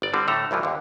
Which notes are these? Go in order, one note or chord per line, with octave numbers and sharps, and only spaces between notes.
G1 D5
D3 G3 C4
A2 D3 A3 A4 A#5
C2 G2 E3 F3
D#2 D3